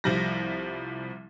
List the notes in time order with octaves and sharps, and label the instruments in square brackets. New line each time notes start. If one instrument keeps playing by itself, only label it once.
[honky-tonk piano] C2 F3 G3 A#6